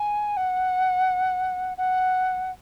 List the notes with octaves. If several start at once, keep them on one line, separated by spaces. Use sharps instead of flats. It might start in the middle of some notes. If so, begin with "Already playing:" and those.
Already playing: G#5
F#5
F#5